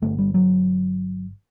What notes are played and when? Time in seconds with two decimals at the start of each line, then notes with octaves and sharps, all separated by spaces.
0.02 G1 G2 D3 A3
0.18 G3
0.34 F#3